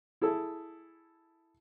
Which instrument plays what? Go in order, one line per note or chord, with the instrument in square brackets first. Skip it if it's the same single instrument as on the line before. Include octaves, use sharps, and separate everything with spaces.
[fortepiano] E4 G#4 A4 E6